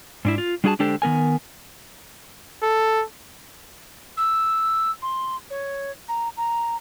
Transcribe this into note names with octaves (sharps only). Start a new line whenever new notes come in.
G#2 D4 E4
F4
G3 D4 F#4 G#4 G#5 A5
D3 G#3 D4 G4 A4 C5
D#3 B3 A#4 G#5
A4
E6
C6
C#5
A#5
A#5